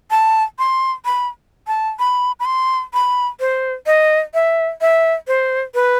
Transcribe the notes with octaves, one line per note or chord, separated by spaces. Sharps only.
A5
C6
B5
A5
B5
B5
C6
B5
C5
D#5
E5
E5
C5
B4